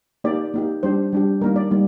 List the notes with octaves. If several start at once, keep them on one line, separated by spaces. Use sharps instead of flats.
A#3 D#4 G4 D5
A#3 D#4 G4
G3 D4 G4 C5
G3 D4 G4
G3 A#3 D#4 A#4
D5
G3 A#3 D#4